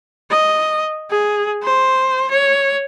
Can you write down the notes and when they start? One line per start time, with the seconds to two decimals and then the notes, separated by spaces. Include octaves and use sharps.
0.30 D#5
1.10 G#4
1.63 C5
2.31 C#5